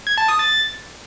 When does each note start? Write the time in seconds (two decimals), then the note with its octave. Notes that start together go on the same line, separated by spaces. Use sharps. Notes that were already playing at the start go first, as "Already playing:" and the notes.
0.07 G#6
0.18 A5
0.28 D#6
0.39 A6